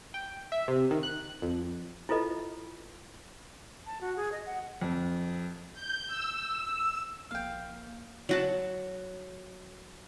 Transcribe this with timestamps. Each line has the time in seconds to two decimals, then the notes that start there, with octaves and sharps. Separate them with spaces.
0.14 G5
0.52 E5
0.68 C3
0.91 D#3
1.03 F#6
1.42 F2
2.09 E4 F4 A4 B4 D#5
3.86 A5
4.01 F#4
4.17 G#4
4.32 D#5
4.46 F#5
4.81 F2
5.74 G6
6.07 E6
7.31 A#1 A#3 F5 G5
8.29 F#3 F#4 A5